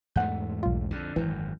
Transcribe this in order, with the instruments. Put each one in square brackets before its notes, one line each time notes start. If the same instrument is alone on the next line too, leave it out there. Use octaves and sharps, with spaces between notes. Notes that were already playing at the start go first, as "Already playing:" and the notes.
[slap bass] E2 G#2 A3 [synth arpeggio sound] F#5 G6
[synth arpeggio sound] B1 F4
[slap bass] F2 D3
[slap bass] G#1 F#2 [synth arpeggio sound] E3